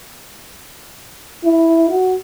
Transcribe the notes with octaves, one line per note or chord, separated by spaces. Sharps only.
E4
F#4